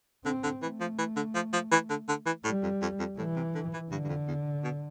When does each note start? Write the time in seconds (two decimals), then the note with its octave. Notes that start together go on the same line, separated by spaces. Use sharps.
0.24 D3 C4
0.43 D3
0.62 E3 A3
0.80 F3
0.98 E3
1.16 D3
1.35 F3
1.53 F3
1.72 E3
1.90 D3
2.09 D3
2.26 E3
2.44 A2 G3
2.63 F2
2.82 F2
2.99 F2
3.18 A2 E3
3.36 C3
3.55 D3
3.73 E3
3.91 G2 D3
4.04 G2
4.09 F2
4.28 E2
4.64 B2